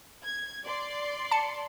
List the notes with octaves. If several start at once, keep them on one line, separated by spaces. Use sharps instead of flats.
G#6
D5 C6
A5 C#7